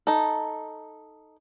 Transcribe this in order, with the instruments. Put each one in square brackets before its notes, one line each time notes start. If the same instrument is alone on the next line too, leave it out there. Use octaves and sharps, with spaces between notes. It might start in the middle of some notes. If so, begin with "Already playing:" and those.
[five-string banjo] D#4 A4